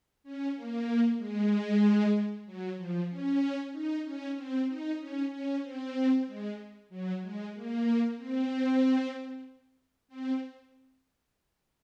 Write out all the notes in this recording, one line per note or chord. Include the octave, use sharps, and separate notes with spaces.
C#4
A#3
G#3
F#3
F3
C#4
D#4
C#4
C4
D#4
C#4
C#4
C4
G#3
F#3
G#3
A#3
C4
C4